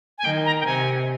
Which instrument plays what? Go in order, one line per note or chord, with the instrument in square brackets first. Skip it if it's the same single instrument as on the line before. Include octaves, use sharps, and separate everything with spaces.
[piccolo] G#5
[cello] D#3 [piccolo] G5
[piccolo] A#5
G5
[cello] C3 [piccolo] G#5